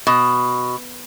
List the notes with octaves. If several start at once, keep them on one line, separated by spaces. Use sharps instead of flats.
B2